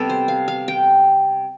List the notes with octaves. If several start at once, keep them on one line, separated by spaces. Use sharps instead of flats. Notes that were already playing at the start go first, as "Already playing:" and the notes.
Already playing: C3 G3 B3 A4
C5
F5
F5
G5